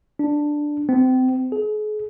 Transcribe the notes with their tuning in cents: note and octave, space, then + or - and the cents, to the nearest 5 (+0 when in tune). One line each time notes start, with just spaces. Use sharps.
D4 +5
C4 -30
G#4 +40